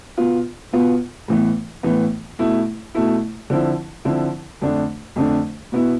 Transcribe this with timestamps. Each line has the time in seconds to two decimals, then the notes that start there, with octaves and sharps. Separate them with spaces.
0.18 B2 B3 F4
0.73 B2 B3 F4
1.28 A2 E3 B3
1.83 A2 E3 B3
2.39 B2 A3 E4
2.95 B2 A3 E4
3.50 D3 F3 C4 E4
4.05 D3 F3 C4 E4
4.61 F2 D3 A3 D4
5.16 F2 D3 A3 D4
5.72 B2 B3 E4